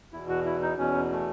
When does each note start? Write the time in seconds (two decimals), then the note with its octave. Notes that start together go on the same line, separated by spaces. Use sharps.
0.13 E2 B2 E4
0.29 F#4
0.45 E4
0.62 D#4
0.78 E2 B2 C#4
1.11 A3